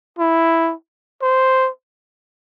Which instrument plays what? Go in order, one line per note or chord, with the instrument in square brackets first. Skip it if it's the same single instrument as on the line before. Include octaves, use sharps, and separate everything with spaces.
[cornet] E4
C5